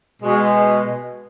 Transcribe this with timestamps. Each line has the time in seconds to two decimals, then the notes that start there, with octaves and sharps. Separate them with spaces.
0.23 B2 G#3